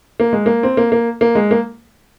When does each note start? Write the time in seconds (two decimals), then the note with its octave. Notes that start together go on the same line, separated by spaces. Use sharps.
0.20 A#3
0.33 G#3
0.46 A#3
0.63 C4
0.77 A#3
0.92 A#3
1.21 A#3
1.35 G#3
1.51 A#3